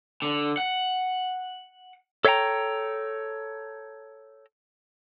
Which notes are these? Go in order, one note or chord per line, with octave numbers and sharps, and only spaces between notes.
D3
F#5
A4 C#5 E5 F5 G5 A#5